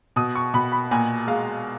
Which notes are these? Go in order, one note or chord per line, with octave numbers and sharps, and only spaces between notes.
B2 D#6
C#6
B2 B5
B5
A#2 G#5
G#3 F5